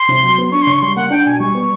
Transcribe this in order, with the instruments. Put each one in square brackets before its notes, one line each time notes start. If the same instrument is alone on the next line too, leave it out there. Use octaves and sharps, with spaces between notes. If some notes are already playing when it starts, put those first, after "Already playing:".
Already playing: [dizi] C6
[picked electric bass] C3
F#3
B3
[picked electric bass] D4 [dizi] C#6
[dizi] C6
[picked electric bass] C#3
[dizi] C#6
[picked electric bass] G3 [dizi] C6
[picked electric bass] A#3 [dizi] F#5
[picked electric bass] D4 [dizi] G5
[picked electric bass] B2 [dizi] G#5
[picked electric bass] G3 [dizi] C#6
[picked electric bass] B3